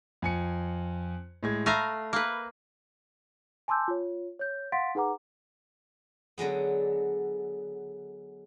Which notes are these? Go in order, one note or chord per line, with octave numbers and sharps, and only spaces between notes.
F2 G#5 C#7
A2 G#3 G#6
A3 F5 A#5 B5 A#6 D#7
A#3 B4
G#5 A5 C6 D6 E6 G6
F4 C#5
C#5 G6
F5 F#5 C6 A6 B6 D7
D#4 G#4 B4 F#5 A#5 D6
D3 F#3 G#3 B3